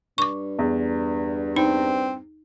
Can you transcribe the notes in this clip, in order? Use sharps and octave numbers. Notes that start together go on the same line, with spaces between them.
G2 C#6 D6
E2
C4 D#4